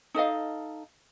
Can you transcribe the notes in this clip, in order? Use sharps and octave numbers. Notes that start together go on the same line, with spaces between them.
D#4 A4 D#5 F5